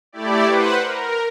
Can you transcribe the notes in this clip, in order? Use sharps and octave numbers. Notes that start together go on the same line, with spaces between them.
A3 E4 G4 D5
B4 C5 F#5
A#4